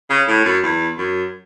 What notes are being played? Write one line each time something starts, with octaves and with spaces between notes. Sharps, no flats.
C#3
A2
F#2
E2
F#2